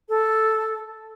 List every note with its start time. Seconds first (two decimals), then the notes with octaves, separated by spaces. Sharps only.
0.09 A4